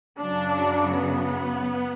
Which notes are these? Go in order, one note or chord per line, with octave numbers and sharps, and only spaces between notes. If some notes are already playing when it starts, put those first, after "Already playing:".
F#2 C#3 F#3 D4
B3